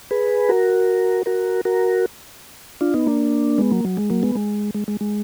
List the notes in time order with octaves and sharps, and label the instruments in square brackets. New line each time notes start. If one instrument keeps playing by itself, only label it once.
[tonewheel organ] G#4 B4
F#4 A#4
F#4 A#4
F#4 A#4
D4 F4
B3 D#4
A#3 D4
G#3 B3
F#3 A#3
F#3
G#3
F#3 A#3
G#3 B3
G#3
G#3
G#3
G#3